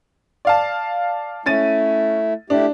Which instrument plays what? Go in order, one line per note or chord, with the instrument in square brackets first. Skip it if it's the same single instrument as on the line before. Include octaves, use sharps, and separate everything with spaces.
[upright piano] D5 F5 A5
[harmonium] A3 E4 [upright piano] C#4 A6 D#7
[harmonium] A3 E4 G4 [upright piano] D4